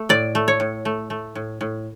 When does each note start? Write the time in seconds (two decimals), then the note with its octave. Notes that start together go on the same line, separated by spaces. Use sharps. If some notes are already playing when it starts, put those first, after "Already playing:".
Already playing: A3
0.09 A2 D5
0.35 A3
0.48 C#5
0.60 A2
0.85 A3
1.10 A3
1.35 A2
1.61 A2